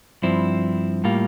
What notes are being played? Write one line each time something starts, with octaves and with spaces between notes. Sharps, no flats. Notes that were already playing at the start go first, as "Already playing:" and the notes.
G2 F3 C4 E4
A2 G3 A#3 F4